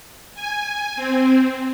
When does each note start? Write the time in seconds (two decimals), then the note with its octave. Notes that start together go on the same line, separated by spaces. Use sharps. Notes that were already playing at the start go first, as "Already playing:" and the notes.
0.35 G#5
0.96 C4